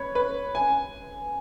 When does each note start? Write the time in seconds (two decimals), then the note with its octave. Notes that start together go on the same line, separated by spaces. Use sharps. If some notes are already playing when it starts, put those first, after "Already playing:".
Already playing: B4 C#5
0.15 B4
0.55 G#5